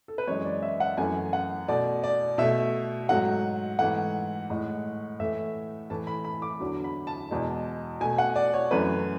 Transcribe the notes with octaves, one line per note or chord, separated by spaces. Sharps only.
A4
B4
F#2 E3 G#3 C#5
D5
E5
F#5
F#2 E3 A3 G#5
F#5
B2 A3 D5
D5
B2 A3 E5
G#2 F#3 A3 F#5
G#2 E3 A3 F#5
A2 G#3
A2 E3 A3 E5
A2 E3 A3 A5
B5
B5
D6
E2 D3 F#3
B5
A5
E2 B2 G#3
B2 A3 G#5
F#5
D5
C#5
F#2 E3 A3 B4